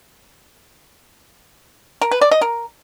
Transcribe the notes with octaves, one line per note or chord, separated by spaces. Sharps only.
A#4
B4
D5
D#5
A#4